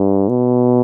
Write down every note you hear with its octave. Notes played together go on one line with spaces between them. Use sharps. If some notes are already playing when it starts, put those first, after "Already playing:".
Already playing: G2
B2